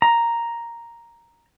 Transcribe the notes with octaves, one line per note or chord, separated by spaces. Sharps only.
A#5